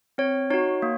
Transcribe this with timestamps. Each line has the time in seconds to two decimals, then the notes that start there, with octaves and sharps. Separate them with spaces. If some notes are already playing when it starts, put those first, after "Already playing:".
0.18 C4 C#5
0.50 D#4 F#4 C#5
0.82 A#3